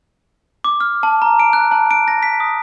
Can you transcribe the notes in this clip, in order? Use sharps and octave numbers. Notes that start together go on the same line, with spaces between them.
D6
F6
A5
A#5
D7
F#6
A5
D7
A#6
B6
D#6